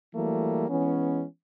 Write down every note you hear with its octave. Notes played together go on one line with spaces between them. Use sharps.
E3 F#3 G3 A3 A#3
E3 G#3 B3 C#4